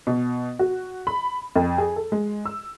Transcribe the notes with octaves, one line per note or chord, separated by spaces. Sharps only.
B2
F#4
B5
F2
G#4
A4
G#3
E6